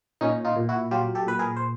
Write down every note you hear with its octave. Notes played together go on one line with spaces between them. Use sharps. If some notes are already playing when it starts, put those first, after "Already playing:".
A#2 C#4 D#4
D#4 F4
A#2
E4 F#4
F#3 F4 G4
G4 A4
A#2 B4
G#4 A#4
C5